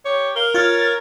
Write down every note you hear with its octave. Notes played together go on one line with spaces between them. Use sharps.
G4 C#5
A#4 F5 G7
F4 C#5 F6 A6